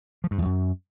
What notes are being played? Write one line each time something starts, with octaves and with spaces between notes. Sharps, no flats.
F3
G2
E2
F#2